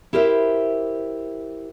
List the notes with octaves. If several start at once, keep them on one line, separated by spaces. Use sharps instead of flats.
E4 G4 A#4 C5 E5